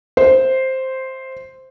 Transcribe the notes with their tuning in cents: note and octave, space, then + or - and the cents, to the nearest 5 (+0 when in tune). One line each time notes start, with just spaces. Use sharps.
C5 +0 E5 +0